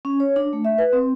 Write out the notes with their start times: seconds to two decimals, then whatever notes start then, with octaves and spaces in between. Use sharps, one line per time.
0.05 C#4
0.20 C#5
0.36 D4
0.53 A3
0.65 E5
0.78 B4
0.93 C4